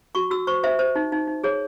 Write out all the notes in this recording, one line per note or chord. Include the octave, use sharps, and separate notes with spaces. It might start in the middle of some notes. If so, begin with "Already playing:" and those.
F#4 C#6
F#4 E6
C5 C#6
C5 E5
C5
D#4
D#4
D#4
G#4 C#5